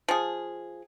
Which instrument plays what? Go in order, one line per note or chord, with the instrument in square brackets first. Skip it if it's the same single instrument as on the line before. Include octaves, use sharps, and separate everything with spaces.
[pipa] F3 G#4